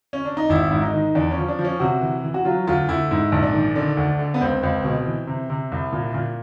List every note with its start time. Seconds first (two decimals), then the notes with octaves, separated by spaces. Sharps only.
0.13 C#4
0.25 D4
0.37 D#4
0.49 G#1 E4
0.71 G#2 E4
0.82 D#4
0.93 D#3
1.15 E2 D4
1.31 C#4
1.37 F3
1.48 D4
1.59 F3
1.65 C#4
1.80 C3 F#4
2.01 E3
2.24 E3
2.34 F#4
2.45 F#3 F4
2.67 D2 F4
2.88 D2 E4
3.11 G#2 E4
3.32 A#1
3.43 D4
3.53 D#3
3.75 D3 D4
3.97 D2
4.19 D3
4.34 B3
4.41 C#2 C4
4.63 C#2
4.84 B2
5.06 E3
5.27 C3
5.50 C3
5.72 C2
5.93 A#2
6.14 A#2